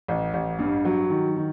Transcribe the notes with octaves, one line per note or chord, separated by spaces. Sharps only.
A1
A1
G2
F#3
D#3
D#3